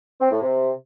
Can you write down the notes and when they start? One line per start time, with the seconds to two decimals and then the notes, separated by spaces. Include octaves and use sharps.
0.21 C4
0.32 A2
0.42 C3